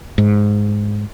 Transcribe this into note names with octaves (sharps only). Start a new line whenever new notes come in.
G#2